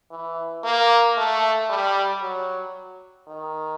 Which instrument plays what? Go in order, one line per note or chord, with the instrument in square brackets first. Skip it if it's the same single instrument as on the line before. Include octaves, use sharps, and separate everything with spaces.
[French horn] E3
A#3
A3
G3
F#3
D#3